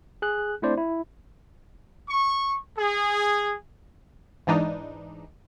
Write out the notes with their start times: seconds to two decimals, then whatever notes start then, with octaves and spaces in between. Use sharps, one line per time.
0.22 G#4 F#6
0.62 A3 C4 D4 E4 C5 D5
0.78 E4
2.09 C#6
2.79 G#4
4.47 G#2 E3 D4 D#4